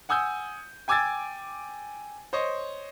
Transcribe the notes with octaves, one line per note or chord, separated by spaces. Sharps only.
F#5 G#5 D#6 E6 G6
G5 G#5 D6 E6 G#6 A6
C5 C#5 D#5